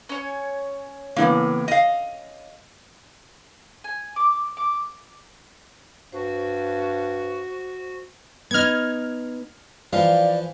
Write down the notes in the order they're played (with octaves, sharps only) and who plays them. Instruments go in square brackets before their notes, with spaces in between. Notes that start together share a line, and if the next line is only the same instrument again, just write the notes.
[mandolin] C#4 C#5
[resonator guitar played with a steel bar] A2 A#3 [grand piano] C#3 E3 B3
[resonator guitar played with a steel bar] D#5 F5 [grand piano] D#7
[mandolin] G#5
D6
D6
[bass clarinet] G2 [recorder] F#4 [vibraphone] C5
[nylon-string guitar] B3 D#4 [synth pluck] F6 G#6
[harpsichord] E3 F3 [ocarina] D5 [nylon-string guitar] F5